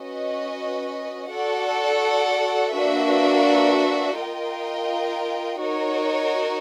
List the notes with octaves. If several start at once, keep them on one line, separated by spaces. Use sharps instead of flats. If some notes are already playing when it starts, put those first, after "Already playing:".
Already playing: C#4 F#4 B4 D#5
F#4 A4 D5 F#5
A#3 D4 F#4 B4 E5
F4 A#4 D#5 G5
D#4 F#4 A#4 C#5